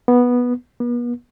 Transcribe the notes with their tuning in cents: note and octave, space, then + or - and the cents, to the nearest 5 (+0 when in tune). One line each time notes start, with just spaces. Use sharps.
B3 -10
B3 -40